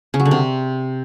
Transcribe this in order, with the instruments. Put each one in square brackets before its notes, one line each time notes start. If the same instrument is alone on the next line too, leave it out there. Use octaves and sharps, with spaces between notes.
[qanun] C#3
F#3
D3
C3